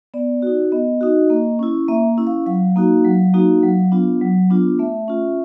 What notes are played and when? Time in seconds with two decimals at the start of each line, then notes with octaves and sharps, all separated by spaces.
0.14 B3 D5
0.42 D#4 F#4
0.72 B3 D#5
1.01 D#4 F#4
1.30 A#3
1.59 C#4 E4
1.88 A#3 E5
2.18 C#4 E4
2.27 F5
2.46 F#3 F5
2.76 A#3 D#4 F#4
3.05 F#3
3.34 A#3 D#4 F#4
3.63 F#3
3.92 B3 D4 F4
4.21 F#3
4.50 B3 D4 F4
4.79 A3 E5
5.08 C#4 F4